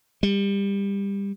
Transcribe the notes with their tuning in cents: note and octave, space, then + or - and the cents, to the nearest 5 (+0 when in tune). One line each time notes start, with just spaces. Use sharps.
G3 +25